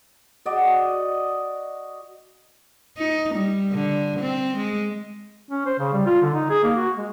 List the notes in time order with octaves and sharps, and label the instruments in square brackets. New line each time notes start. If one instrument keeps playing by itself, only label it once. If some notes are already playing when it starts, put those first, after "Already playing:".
[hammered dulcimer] F#4 D5 D#5
[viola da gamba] D#4
G3
D3
C4
G#3
[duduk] C#4
C5
C#3
G3
F4
D3
D#4
G#4
A#3
F#4
G#3